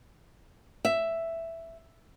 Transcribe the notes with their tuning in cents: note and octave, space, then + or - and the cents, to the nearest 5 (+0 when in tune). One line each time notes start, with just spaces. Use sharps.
E5 +5